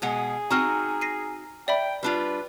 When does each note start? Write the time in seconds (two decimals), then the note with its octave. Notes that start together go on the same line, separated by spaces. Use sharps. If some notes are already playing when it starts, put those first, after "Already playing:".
0.02 B2 G#3 G#4 F#5
0.50 C4 D#4 F#4 A#5 F6
1.01 A#6 C7 D#7
1.68 D5 E5 G5 B5
2.03 G3 D4 F4 B4